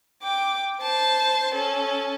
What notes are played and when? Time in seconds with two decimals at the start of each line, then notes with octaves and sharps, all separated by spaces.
0.23 G5 D6
0.81 C5 A5
1.55 C#4 A4